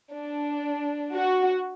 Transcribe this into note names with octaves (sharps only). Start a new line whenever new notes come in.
D4
F#4